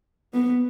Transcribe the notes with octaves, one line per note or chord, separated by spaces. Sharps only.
B3